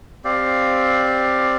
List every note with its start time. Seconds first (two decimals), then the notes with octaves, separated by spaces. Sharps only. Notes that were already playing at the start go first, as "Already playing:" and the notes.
0.24 C4 G4 D5 F5